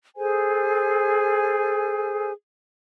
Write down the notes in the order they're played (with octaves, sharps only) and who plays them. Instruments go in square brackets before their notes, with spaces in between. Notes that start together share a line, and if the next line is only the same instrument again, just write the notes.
[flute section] G#4 A4 C5 G#5